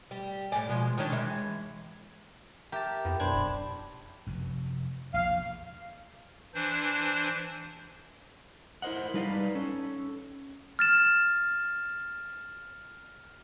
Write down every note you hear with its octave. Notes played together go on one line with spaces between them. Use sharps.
G3
A2 D5 G#5
B2 F3 G#3
D#3 C#4 D4
E3 G#3
G4 A#4 E5 A5
F2 B3 E4 G4 A#4
B1 F#2 D4 C5 B5 G#6
D1
F1 F#2
A#1 E2 F5
E3 D4 C5
E4 A#4 C5 D#5 F#5
G3 A3 D#4 B4 D5 F5
C#4 A4
F6 A6 E7